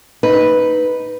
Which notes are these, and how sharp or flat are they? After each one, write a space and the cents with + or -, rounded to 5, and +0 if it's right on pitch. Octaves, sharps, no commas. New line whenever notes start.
D#4 +0 B4 +0